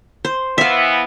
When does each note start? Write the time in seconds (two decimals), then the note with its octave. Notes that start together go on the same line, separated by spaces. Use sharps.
0.25 C5
0.58 E3 B3 E5 F5